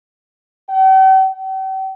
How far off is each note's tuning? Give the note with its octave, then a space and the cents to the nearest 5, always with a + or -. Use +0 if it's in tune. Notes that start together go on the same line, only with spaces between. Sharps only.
G5 -45
G5 -40